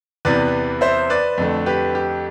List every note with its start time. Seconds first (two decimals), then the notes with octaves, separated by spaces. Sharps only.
0.25 E2 C3 E3 B4 D5
0.81 C5 E5
1.10 B4 D5
1.38 F2 D3 A3
1.66 G4 B4
1.95 G4